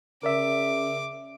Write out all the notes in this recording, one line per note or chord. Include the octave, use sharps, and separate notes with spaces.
C#3 A#4 D5 E5 D6